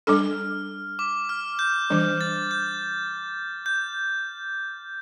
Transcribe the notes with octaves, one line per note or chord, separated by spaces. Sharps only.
G3 D4 A4 F6
D6
F6
G6
E3 G3 D4
A6
G6
G6